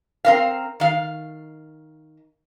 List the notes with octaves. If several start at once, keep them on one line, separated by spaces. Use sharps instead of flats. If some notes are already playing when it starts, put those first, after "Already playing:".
C4 A#4 F5
D#3 F5